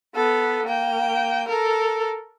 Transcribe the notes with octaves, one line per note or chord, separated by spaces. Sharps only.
B3 A4
A#3 G5
A4 A#4